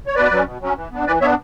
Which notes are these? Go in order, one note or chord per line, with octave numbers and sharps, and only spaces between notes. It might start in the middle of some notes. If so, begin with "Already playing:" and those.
C#5
B2 B4 D5
F#3 C#4
B2
F#3 C#4
E3
B3 D4
E3 B4 D5
B3 D4 C#5 E5